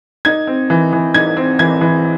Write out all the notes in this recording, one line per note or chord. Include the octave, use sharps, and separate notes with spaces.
D#4 G#6
C4
E3
E3
D#4 G#6
C4
E3 G#6
E3